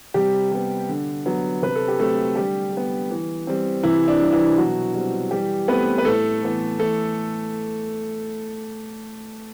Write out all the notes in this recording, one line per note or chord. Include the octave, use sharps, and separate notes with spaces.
C3 G3 G4
G3 B3
D3
F#3 B3
C3 B4
A4
G4
F#3 A3 C4 A4
D3 G3 G4
G3 B3
E3
G3 C4
C3 E3 E4
D4
G3 C4
E3 E4
B2 F#3 F#4
G3 C4
E3 G3 G4
A3 B3 C4 B4
B4
A2 A3 A4
E3 B3
E3 A3 A4